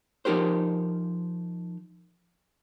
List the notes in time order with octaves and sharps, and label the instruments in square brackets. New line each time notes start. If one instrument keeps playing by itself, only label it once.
[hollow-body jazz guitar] F3 D#4 G4 A#4 C5